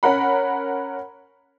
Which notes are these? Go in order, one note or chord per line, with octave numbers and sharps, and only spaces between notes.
C#4 A#4 F#5 B5